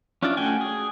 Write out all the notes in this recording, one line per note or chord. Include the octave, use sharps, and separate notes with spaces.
C#4 D4 E4 F4 D5
A3 C#4 F#4 G5 G#5
G#4